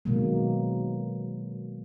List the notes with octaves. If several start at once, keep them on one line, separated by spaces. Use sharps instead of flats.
B2 D#3 F#3 G#3 A#3